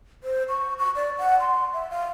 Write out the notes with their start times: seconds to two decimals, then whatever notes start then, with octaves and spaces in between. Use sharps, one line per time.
0.24 C5
0.49 C#6
0.79 C#6
0.96 D5
1.19 F#5
1.40 C6
1.73 E5
1.91 F5